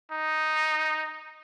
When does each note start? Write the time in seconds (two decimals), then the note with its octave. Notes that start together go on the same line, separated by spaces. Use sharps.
0.12 D#4